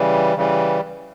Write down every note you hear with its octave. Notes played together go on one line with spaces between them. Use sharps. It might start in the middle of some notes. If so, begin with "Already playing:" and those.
Already playing: C#3 E3 G3
C#3 E3 G3